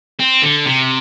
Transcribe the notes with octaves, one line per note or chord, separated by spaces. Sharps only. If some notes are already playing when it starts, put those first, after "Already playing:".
C4
D3
C3